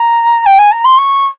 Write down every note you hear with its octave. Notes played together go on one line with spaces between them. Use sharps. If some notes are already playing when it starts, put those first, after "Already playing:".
Already playing: A#5
G5
G#5
A#5
C6
C#6